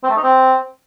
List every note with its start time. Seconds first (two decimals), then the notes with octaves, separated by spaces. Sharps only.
0.04 C4
0.10 A3
0.17 D#4
0.23 C4